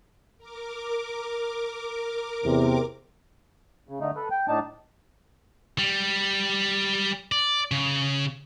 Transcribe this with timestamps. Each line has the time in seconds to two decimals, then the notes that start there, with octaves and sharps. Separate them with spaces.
0.38 A#4 D6
2.45 E2 C3
3.89 C#3
4.01 D3 A3 D#4
4.16 A4 B4
4.31 G5
4.48 A2 D4 D#4 A5
5.79 G3
7.32 D5
7.71 C#3